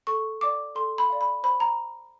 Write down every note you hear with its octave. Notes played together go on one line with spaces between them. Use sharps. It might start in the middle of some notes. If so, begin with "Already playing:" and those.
A4 C#6
D5 F5 D6
A4 C6
B5
D5 F5
B5
C5 B5
A#5